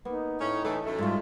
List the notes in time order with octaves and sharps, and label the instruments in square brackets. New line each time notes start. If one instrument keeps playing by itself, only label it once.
[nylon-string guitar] A#3 [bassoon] B3 [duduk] D#4
[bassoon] A2 [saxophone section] C#4
[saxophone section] E3 A3 [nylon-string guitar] A4
[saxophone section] F#2 A2 A3
[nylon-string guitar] G#2 G3 [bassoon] G#3 [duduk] F4